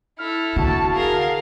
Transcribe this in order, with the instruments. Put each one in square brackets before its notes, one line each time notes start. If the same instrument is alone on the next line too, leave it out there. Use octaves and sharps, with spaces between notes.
[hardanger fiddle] E4 A4 [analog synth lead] F6
[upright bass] D3 [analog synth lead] F#4 [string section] A5
[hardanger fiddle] G#4 A#4 [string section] F5